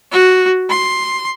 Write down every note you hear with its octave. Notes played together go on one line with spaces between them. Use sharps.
F#4
C6